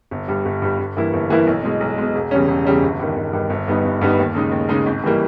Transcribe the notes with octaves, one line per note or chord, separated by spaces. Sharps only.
G1
G2 G3
G1
G2 G3
G1
G2 E3 A#3 E4
G1
G2 E3 A#3 E4
B1
B2 G#3
B1
B2 G#3
E1
E2 C#3 G3 C#4
E1
E2 C#3 G3 C#4
G1
G2 D#3
G1
G2 D#3
G1
G2 G3 B3 D#4
G1
G2 G3 B3 D#4
D#2
C#3 G#3 D#4
D#2
C#3 G#3 D#4
G#1
E3 G3 A#3